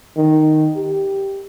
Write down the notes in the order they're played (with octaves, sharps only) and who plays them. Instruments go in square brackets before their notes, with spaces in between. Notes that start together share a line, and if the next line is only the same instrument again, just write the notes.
[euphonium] D#3
G4